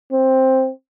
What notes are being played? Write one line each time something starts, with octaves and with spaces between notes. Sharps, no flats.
C4